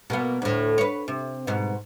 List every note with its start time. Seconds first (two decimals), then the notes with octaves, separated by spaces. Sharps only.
0.10 B2 A#3 B3
0.42 D2 A2
0.78 B4 C#5
1.08 C3
1.47 G#2 B2